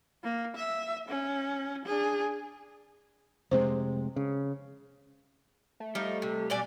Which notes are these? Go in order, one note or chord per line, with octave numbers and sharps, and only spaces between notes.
A#3
E5
C#4
D4 G#4
F1 C3 G#3 C5
C#3
A3
F3 G3 D#4
C3
B2 D5 G#5